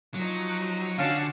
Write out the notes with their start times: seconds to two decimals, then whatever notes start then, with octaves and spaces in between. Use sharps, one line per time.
0.14 F3 F#3 D#4
0.98 D3 C#4 F#4 F5 A5